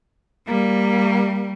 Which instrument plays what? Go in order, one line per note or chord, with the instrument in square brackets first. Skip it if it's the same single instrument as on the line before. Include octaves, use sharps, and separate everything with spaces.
[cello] G3 [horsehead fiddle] A#3